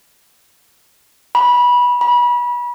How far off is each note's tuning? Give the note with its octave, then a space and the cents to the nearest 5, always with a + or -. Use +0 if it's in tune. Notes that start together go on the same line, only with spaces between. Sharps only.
B5 -20
B5 -30